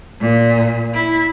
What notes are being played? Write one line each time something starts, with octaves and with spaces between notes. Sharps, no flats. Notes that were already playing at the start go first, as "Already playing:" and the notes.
A#2
E4